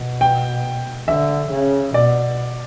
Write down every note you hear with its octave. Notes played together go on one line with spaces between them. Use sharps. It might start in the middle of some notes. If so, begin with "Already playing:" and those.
Already playing: B2
G5
D3 E5
C#3
B2 D5